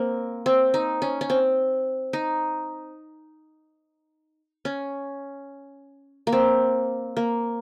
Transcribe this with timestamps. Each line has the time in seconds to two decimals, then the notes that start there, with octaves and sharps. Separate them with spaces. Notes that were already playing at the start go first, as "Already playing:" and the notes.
Already playing: A#3 C4
0.46 C4
0.74 D#4
1.02 C#4
1.21 C#4
1.30 C4
2.13 D#4
4.65 C#4
6.27 A#3
6.32 C4
7.17 A#3